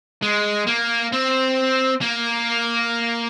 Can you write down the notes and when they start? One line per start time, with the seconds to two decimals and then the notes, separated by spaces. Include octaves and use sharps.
0.22 G#3
0.67 A#3
1.12 C4
2.01 A#3